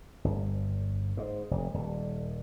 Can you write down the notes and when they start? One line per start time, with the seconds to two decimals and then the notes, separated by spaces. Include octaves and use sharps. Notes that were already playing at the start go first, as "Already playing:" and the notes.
0.24 G1
1.17 G#2
1.51 F1
1.74 D#1